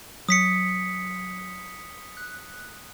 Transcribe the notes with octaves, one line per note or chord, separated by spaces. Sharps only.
F#3 D#6 B6 C#7
F#6